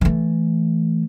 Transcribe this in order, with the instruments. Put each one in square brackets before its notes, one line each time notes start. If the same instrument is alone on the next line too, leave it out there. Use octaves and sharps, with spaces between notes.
[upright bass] E3 A3